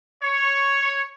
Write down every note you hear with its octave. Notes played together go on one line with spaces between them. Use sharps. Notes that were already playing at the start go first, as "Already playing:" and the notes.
C#5